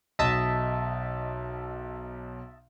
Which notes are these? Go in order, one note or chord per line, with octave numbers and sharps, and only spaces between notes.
B1 D#5 E5 A5